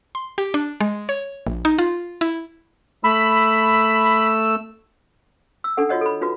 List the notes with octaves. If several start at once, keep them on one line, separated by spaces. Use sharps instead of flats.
C6
G4
D4
G#3
C#5
A#1
D#4
F4
E4
A3 B5 E6
E6
D4 D#4 A4 F#5
F4 F#4 C#5 D#5 F#5
A4 B5
D#4 F4 F#4 B4